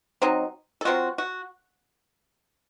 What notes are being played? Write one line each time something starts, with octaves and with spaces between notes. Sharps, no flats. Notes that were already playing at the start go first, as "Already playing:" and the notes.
F#3 C4 D#4
A4
F#3 C4 F4 F#4
F#4